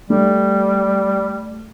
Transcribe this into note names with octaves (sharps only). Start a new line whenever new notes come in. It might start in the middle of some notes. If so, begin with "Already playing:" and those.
G3 A3